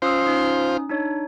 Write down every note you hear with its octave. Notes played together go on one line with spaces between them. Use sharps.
C#4 F4 C5 D#6 E6
C#4 D#4 D#6
D4 D#4 C#5